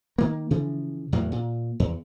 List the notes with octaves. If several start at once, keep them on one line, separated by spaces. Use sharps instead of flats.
D#3 A#3
C#3 E3 F3
E2 A2 F#3 A#3
A#2
E2